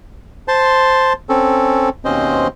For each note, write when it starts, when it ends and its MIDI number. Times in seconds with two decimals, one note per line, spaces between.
0.48 1.13 72
0.48 1.13 81
0.48 1.13 84
1.29 1.89 60
1.29 1.89 61
1.29 1.89 69
2.05 2.48 39
2.05 2.48 47
2.05 2.48 60
2.05 2.48 61
2.05 2.48 72
2.05 2.48 75